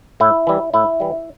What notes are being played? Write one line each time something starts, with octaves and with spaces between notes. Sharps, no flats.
A2 E4
E3 G3
A2 E4
E3 G3